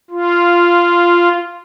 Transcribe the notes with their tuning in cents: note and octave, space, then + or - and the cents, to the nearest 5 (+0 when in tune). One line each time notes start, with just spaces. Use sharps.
F4 -10